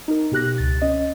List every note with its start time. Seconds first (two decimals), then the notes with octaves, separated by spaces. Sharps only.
0.08 D#4 A#4
0.32 B2 G4 F#6 A#6
0.58 C#2 A6
0.82 C#4 D#5